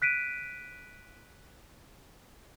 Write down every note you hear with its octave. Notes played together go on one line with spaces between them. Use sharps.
F#6 B6 D7 D#7